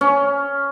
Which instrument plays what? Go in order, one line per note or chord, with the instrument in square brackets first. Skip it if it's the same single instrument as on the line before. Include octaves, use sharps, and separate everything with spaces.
[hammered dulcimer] C#4